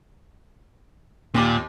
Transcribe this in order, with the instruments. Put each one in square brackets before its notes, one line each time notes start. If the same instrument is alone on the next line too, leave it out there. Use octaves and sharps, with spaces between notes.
[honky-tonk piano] D#2 G4 D6 [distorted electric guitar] A#2